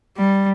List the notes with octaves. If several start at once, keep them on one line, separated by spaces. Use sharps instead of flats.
G3